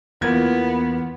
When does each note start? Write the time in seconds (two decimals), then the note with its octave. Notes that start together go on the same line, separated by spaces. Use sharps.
0.21 E2 E3 A#3 B3 F4 A#4 G#6